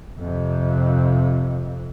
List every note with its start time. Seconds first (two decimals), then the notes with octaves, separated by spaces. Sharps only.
0.18 F2 C3